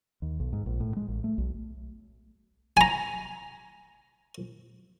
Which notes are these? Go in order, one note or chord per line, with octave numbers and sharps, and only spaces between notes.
D#2
B1
G#2
A#1
A2
G#3
A1
A3
B1
G#5 A#5